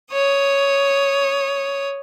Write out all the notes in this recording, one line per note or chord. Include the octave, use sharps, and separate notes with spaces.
C#5 D#6